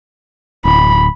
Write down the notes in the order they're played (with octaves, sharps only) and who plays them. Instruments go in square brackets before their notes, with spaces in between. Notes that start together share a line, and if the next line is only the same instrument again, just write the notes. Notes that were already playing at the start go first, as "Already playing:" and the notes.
[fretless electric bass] D1 [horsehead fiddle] B5